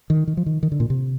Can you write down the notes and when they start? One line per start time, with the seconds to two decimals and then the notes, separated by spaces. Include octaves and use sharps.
0.10 D#3
0.27 D#3
0.37 F3
0.46 D#3
0.63 D#3
0.72 D3
0.80 A#2
0.90 C3